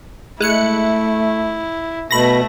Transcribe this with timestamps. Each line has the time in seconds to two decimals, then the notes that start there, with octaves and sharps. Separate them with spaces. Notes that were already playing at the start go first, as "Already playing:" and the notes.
0.41 G#3 A3 E4 F#6 C#7
2.11 B2 A3 B5 A#6